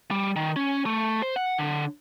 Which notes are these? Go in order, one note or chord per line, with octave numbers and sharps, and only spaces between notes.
G3
D#3
C#4
A3
C5
F#5
D3